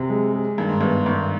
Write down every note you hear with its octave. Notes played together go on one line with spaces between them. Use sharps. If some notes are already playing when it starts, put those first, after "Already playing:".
Already playing: F#2 C3
G#3
G#3
G2 D#3
G#2
G1 G2 B3
G1 G2 D#3